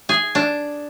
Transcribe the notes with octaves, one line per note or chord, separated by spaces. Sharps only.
G#4
D4